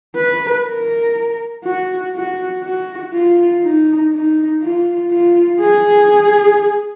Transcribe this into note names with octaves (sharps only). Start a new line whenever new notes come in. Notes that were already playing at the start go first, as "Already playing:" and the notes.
B4
A#4
F#4
F#4
F#4
F4
D#4
D#4
F4
F4
G#4